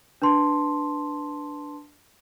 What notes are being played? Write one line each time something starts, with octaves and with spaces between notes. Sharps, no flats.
D4 B4 A5 C6